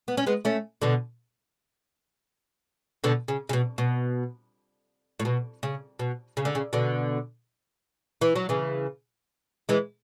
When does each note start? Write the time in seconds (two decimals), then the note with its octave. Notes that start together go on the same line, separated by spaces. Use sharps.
0.08 B3
0.17 C#4
0.27 G#3 B3
0.45 A3 C#4
0.82 B2 D3
3.04 B2 D3
3.28 C#3
3.49 C#3
3.53 B2
3.78 B2
5.20 A2
5.25 B2
5.63 C#3
5.99 B2
6.37 C#3
6.45 D3
6.55 C#3
6.73 B2 D3
8.21 E3
8.36 F#3
8.49 C#3 E3
9.69 E3 G#3